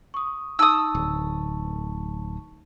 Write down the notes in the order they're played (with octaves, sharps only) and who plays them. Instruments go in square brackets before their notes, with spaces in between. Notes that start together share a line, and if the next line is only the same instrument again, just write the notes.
[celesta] C#6 D#6
[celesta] D#4 A5 C#6 [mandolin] D#6 E6
[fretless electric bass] D1